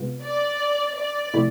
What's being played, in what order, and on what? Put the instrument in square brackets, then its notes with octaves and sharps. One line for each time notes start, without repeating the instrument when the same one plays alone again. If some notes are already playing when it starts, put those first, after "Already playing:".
Already playing: [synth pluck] C3 G#3 B3 F4
[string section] D5
D5
[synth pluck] C3 F3 A3 E4